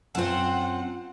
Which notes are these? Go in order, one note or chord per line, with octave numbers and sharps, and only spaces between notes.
F#2 C4 F4 A4 F#5